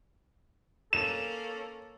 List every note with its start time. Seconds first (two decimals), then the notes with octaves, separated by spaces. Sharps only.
0.93 A#3 C#4 A4 E7